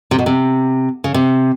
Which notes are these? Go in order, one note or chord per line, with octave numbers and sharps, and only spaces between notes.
C3
B2
C3
C#3
C3